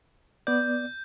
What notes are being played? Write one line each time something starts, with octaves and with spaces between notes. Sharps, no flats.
B3 D5 G6